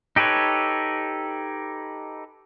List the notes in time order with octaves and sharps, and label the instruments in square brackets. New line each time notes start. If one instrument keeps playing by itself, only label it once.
[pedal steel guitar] D#4 G4 A4 B4 C#5